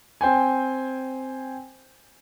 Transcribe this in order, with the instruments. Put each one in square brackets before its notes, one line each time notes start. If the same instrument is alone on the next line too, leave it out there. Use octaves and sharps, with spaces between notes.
[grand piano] C4 C5 G5 G#5